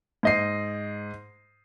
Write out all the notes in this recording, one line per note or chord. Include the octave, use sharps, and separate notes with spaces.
G#2 D#5 C7